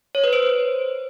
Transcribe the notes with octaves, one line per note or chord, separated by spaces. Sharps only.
C#5
B4
C5